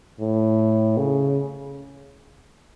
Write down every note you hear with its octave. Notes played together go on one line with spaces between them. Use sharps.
A2
C#3